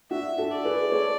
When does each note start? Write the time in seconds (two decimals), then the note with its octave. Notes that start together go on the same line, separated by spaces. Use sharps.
0.11 D4 F#4 E5
0.38 F#4 A4
0.51 D5
0.65 G#4 B4
0.92 A4 C#5